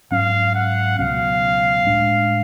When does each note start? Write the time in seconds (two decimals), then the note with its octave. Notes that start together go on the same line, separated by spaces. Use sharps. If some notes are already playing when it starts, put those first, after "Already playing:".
0.11 G#2 F#3 C#4 F5
0.55 F#5
0.98 C#2 B2 F#3 C#4 F5
1.86 A2 G#3 D4